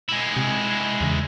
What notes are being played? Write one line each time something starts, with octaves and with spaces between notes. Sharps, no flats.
G#3 E4
C3
E2 C#3